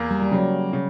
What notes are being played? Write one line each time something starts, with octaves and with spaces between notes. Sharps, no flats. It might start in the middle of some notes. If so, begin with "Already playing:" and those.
Already playing: E2 A#3
G3
G3
C#3 F#3
C#3